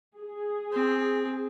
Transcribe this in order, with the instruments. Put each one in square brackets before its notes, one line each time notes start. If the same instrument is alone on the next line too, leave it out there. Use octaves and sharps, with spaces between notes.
[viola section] G#4
[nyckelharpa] C4